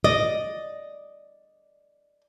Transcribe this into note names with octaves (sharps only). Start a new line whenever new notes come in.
D5 D#5